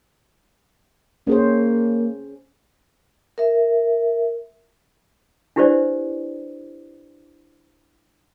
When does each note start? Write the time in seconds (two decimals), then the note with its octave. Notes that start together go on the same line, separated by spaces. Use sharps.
1.27 A#3 C#4 G#4 C5
3.38 A#4 E5
5.56 D4 E4 G4 B4 C5 D5